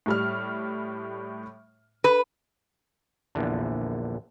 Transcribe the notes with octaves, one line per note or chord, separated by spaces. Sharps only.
A2 G3 F6
B4
A#1 E2 D3